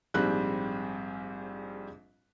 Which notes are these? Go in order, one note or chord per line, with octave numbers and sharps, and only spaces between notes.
A#1 G#2 G3 C4 F#6